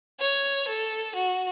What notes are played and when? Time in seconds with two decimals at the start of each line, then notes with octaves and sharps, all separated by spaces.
0.20 C#5
0.68 A4
1.16 F#4